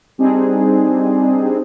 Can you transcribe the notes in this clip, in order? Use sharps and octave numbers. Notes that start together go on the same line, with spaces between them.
G3 C4 D4 D#4 G#4